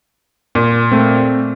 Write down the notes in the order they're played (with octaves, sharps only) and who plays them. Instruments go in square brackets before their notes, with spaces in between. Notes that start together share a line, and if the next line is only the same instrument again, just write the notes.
[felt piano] A#2
[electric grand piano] A3 C4